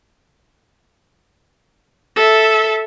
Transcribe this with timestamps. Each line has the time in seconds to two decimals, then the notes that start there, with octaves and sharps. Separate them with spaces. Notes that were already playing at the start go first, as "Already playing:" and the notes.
2.16 A4 E5